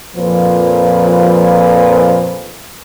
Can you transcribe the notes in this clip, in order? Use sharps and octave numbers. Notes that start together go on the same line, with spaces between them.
F2 A#2 F3 B4